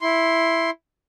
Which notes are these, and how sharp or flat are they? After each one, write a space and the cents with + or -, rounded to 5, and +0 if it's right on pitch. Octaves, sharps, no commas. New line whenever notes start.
E4 +0 C6 +5